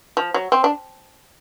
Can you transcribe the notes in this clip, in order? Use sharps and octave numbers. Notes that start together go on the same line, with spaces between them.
F3
F#3
C4
D4